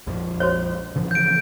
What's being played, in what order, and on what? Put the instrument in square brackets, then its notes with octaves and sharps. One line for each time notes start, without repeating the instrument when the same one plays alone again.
[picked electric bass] A#1 F2 F3
[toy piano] F#4 C5 C#5
[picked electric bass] C#3 E3 F3
[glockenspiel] G6 D7